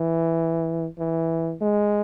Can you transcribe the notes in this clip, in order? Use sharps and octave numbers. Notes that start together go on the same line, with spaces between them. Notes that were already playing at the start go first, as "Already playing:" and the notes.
Already playing: E3
E3
G#3